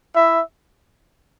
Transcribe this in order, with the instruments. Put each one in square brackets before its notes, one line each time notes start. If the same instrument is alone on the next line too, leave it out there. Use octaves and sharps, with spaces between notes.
[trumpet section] E4 E5